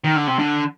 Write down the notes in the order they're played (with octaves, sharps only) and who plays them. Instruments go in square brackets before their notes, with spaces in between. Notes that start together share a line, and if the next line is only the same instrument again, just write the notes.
[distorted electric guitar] D#3
D3
C3
D3